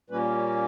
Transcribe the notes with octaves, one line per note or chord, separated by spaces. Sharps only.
A#2 G3 A#3 C#4 B4